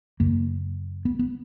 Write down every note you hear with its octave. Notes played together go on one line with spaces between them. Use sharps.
F#2 C#3 A#3
B3
B3